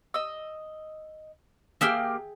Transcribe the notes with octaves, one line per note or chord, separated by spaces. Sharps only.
D#5 E6
A#3 G4 G#4 E5 G5 F6